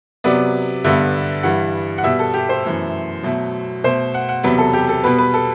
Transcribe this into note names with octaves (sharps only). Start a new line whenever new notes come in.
C3 F#3 B3 D5
G2 D3 G3 B3 E5
G2 E3 G3 F#5
F#5
B2 G3 B3 E5
A4
G4
C5
F#2 E3 A3
B2 F#3 A3
B2 A3 C5
F#5
F#5
E2 C3 F#3 B3 B4
A4
G4
A4
B2 G3 B3 B4
B4
A4